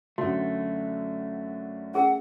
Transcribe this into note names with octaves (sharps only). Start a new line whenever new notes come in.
F#2 D3 A3 F#4
C#4 G#4 A#4 F#5